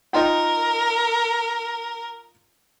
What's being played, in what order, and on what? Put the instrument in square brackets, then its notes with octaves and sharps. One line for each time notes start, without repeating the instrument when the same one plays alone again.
[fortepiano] D#4 F4 G5 [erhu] A#4